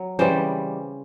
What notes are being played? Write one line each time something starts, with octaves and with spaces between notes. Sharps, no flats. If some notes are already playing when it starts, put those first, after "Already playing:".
Already playing: F#3
C#3 E3 G3 C5 D5